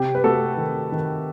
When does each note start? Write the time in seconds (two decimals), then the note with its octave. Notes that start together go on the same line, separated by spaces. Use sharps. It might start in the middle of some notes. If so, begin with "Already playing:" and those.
Already playing: C3 G4
0.15 B4
0.24 A3 F#4 A4
0.57 D#3
0.92 D#3